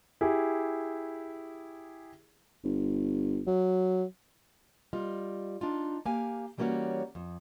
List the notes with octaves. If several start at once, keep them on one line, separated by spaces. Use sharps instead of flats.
E4 G4 G#4
G1
F#3
G3 F4 D#5
D4 D#4 F4
A#3 G4 F5 G#5
E3 G3 A#3 C#4 F#4 C#5
F2